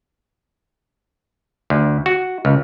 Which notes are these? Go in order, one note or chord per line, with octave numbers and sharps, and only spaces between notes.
D2
F#4
C#2